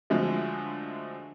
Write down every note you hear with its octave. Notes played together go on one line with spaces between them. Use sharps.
D3 F3 F#3 G#3 A3